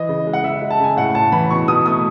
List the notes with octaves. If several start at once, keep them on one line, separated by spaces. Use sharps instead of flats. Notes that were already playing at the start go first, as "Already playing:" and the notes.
Already playing: E3 D#5
C#3
G#3
F#5
C#3 E5
G#3
A5
C#3 G#5
A2 F#5
A2 A5
E3 B5
B2 C#6
B2 D#6
A3 D#6